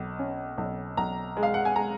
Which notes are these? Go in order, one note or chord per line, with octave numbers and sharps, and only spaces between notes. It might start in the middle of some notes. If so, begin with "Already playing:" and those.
Already playing: B1
C#4
B1
B1 A#5
G#3
F5
F#5
G#5
G#3 A#5